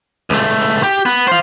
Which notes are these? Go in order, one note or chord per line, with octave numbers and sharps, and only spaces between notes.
C#2 A3
G4
B3
C5 F5